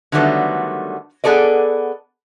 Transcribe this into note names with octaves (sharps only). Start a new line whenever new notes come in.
D3 D#3 F#3 G3 A3 B3
B3 G#4 A4 D5 D#5